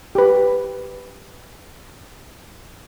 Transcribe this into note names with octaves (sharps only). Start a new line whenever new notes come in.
G4 B4